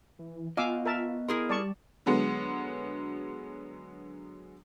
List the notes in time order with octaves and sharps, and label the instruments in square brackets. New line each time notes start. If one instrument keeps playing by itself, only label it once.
[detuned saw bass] E3
[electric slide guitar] B3 D#5 [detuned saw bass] F4 [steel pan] F5 D6 E6 [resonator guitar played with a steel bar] G#5
[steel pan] A#4 E5 A5
[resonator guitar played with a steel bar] E4 G#4 A#4 [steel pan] C6
[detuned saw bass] G3 [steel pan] D5 A5 C#6
[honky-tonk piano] D3 F#3 G#3 B3